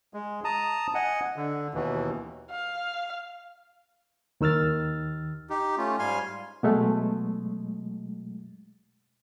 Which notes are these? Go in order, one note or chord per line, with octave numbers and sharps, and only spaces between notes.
G#3
A5 A#5 D#6
D#5 F#5 G#5
D3
D#2 B2 E3
F5
D#2 D#3 E6 F6 A6
D#4 G4
A3 C#4 F4
G#2 G3 F5 G#5 C6 F6
B2 F#3 G#3 A3